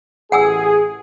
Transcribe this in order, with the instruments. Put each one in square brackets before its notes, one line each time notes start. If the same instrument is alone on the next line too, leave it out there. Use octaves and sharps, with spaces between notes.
[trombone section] A1 G#4 [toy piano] F#5 G#5 E6